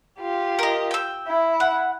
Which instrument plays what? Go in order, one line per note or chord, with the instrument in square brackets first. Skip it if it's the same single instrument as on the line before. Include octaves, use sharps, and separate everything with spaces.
[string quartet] F4 G4
[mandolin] A#4 D#5
G5 E6
[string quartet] E4
[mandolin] F#5